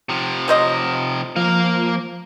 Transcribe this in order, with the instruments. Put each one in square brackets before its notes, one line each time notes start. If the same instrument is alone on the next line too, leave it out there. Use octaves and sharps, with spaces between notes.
[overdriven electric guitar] C3 F3
[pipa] F#3 C5 D#5
[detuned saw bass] F3 [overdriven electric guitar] A#3 F5